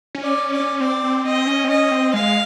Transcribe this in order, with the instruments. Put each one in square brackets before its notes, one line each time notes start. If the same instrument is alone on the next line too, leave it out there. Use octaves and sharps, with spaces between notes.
[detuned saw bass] C#4
[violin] D5
[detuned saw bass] C#4
[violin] D5
[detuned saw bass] C#4
[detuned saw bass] C4 [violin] D5
[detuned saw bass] C4
[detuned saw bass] C4 [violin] D#5
[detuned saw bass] C#4
C4
[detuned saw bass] C#4 [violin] D#5
[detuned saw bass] C4
[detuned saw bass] G#3 [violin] F5